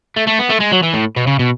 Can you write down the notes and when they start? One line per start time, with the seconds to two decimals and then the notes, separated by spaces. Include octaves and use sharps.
0.17 A3
0.27 A3
0.40 B3
0.50 A3
0.61 G#3
0.73 F#3
0.83 E3
0.94 A2
1.17 B2
1.27 C#3
1.39 B2